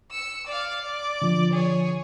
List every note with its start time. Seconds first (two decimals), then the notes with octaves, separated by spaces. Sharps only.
0.11 E6 C#7
0.47 D5 F5
0.82 D5
1.22 D3 F3
1.53 G#4 C#5